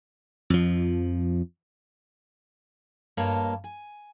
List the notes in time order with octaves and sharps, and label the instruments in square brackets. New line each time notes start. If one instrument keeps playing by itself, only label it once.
[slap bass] F2 F3
[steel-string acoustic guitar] G2 A#3 C#5 D#5 A5 A#5
G#5